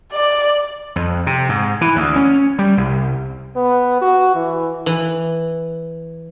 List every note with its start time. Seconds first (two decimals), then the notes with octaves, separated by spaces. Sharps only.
0.12 D5
0.96 F2
1.27 C3
1.49 G#2
1.81 E3
1.96 D2
2.16 C#4
2.59 G3
2.77 C2
3.56 B3
4.01 F#4
4.35 E3
4.86 E3